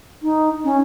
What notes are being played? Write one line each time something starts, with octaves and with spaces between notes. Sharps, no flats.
D#4
C#4